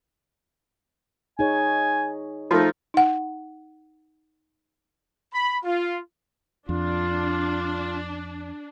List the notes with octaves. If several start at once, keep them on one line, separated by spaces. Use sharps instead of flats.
D#4 G#4 C#5 G#5
F3 A3 D#4
D#4 F#5
B5
F4
F2 D4 F4